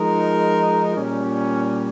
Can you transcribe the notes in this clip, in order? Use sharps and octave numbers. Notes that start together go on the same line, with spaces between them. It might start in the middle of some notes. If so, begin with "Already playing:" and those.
Already playing: F3 G#3 D#4 A#4
A#2 G3 C#4